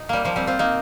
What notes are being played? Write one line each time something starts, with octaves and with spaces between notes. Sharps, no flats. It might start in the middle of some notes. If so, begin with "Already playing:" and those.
Already playing: D#4
G3 A#3
F3 A#3
G3 C4
C4 F4
A#3 D#4